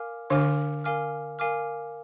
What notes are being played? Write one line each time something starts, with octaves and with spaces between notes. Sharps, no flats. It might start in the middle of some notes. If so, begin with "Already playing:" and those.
Already playing: A#4 F5 G#5 D6 F6
D3 D4 A#4 F5 G#5 D6 F6
A#4 F5 G#5 D6 F6
A#4 F5 G#5 D6 F6